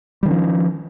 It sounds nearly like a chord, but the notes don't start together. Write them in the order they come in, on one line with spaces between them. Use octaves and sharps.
G3 D#3 C#4 F3